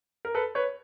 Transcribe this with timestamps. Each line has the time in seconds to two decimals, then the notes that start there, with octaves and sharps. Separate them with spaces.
0.25 A#4
0.35 A4 B4
0.55 B4 C#5